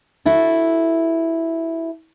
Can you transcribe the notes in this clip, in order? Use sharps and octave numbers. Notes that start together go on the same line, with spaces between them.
E4 F#4 A4